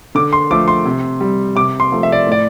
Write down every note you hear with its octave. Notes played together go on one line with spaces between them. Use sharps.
D3 D6
C6
F3 A3 D6
C6
C3
G3
C3 D6
C6
F3 A3
E5
D5
A2 D5